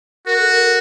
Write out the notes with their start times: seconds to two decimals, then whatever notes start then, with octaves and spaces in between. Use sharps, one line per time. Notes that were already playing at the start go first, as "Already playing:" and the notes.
0.27 F#4 A#4
0.40 A4
0.52 A#4